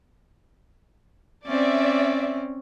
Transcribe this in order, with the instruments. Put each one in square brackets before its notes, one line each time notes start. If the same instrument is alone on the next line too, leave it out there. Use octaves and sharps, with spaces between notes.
[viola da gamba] C4 C#4 [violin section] D5 E5